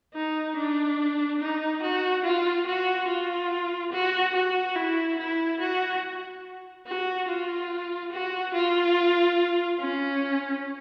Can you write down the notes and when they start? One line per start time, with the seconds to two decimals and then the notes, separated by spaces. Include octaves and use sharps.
0.14 D#4
0.56 D4
1.39 D#4
1.82 F#4
2.24 F4
2.66 F#4
3.08 F4
3.92 F#4
4.35 F#4
4.76 E4
5.17 E4
5.60 F#4
6.86 F#4
7.28 F4
8.12 F#4
8.53 F4
9.80 C#4